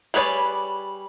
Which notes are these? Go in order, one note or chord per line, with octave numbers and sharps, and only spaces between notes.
G3 G#4 B4 C#5 D5